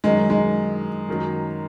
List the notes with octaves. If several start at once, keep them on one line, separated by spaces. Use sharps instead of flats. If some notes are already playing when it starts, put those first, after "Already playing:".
F#2 D#3 F#3 G#3
G#3
F#2 D#3 F#3